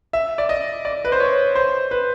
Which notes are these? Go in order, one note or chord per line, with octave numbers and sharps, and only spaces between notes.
E5
D5
D#5
D5
B4
C5
C#5
C5
B4